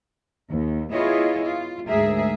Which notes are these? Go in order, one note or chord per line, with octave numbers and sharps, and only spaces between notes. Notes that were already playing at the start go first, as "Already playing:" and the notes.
D#2
B3 E4 F4 G#4 C#5 D#5
F4
D2 G#2 G#4 A#4 E5